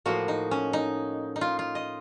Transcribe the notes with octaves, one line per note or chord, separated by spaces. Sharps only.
A2 F3 A#3 F#4
D#4
C#4
D#4
D#4
F4
F4
D#5